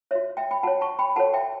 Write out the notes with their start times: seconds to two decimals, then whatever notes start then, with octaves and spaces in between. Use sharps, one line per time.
0.11 F#4 C#5 E5
0.37 E5 G5
0.51 G5 B5
0.63 F#4 C#5 F#5 A5
0.81 A5 C#6
0.99 G5 B5
1.16 F#4 A4 C#5 F#5 A5
1.34 E5 G5